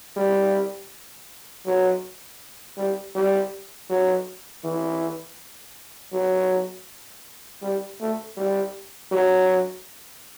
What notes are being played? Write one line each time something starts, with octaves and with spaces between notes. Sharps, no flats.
G3
F#3
G3
G3
F#3
E3
F#3
G3
A3
G3
F#3